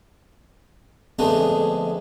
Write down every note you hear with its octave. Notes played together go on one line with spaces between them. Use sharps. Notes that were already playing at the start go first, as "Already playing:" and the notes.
F2 D3 G#3 A3 B3